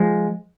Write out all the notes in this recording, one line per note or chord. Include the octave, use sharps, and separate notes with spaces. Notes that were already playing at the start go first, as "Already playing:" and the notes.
Already playing: F3 G#3